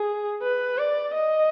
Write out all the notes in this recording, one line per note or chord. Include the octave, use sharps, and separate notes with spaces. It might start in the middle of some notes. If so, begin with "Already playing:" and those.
Already playing: G#4
B4
D5
D#5